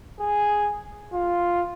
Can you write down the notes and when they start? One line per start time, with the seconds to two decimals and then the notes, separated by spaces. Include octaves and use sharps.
0.20 G#4
1.13 F4